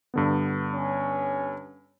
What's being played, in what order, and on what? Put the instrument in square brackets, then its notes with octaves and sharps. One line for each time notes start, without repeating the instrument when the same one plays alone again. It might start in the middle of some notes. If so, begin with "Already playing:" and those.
[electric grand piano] G2 D3 B3
[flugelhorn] C#4